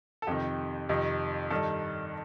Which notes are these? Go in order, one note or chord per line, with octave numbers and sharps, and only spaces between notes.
A4
F2 C3 D#3 G4
F2 C3 D#3
G2 D#3 A4